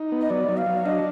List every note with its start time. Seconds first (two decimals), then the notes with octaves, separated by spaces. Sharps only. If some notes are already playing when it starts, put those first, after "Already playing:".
Already playing: D#4
0.12 B3
0.21 D#5
0.30 F#3 D5
0.48 F#3
0.57 F5
0.66 F#3
0.85 D4 D#5